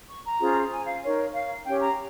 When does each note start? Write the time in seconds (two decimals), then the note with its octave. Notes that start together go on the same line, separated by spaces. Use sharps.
0.09 C#6
0.25 A#5
0.40 C#4 F4 G#4 C5
0.72 G#5
0.87 F5
1.03 D#4 A#4 C#5
1.33 F5
1.65 C#4 G4 C#5 G5
1.81 A#5